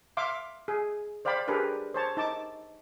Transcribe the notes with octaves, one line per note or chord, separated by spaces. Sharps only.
E5 F5 C6 D6
G#4
C5 D5 F5 G5 B5
D4 G4 G#4 A#4 B4
C5 C#5 A5
D#4 A5 D6